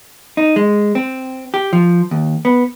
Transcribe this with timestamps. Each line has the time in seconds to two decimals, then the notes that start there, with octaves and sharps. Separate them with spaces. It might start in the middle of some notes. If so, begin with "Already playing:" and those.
0.37 D#4
0.56 G#3
0.95 C4
1.54 G4
1.73 F3
2.11 D#2
2.45 B3